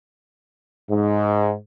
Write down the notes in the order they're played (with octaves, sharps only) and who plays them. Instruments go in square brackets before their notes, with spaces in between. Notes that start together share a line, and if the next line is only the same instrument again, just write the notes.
[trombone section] G#2